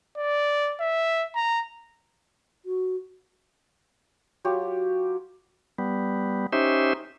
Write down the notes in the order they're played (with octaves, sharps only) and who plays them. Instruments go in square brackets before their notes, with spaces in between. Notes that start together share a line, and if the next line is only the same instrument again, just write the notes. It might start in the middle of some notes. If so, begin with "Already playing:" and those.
[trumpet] D5
E5
A#5
[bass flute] F#4
[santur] F#3 F4 G4
[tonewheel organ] G3 B3
C#4 D#4 G4 C5 E5